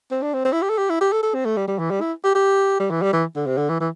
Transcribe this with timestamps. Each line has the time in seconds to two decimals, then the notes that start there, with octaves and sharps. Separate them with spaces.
0.11 C4
0.22 D4
0.34 C4
0.45 C4
0.52 E4
0.62 G4
0.69 A4
0.78 G4
0.90 E4
1.01 G4
1.12 A4
1.22 A4
1.34 C4
1.45 A3
1.57 G3
1.68 G3
1.79 E3
1.91 G3
2.01 E4
2.24 G4
2.35 G4
2.80 G3
2.91 E3
3.02 G3
3.13 E3
3.35 D3
3.46 C3
3.58 D3
3.69 E3
3.80 E3